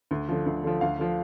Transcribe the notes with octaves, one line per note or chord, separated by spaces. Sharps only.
D2
D3 F3
D2
D3 F3
D2 F5
D3 F3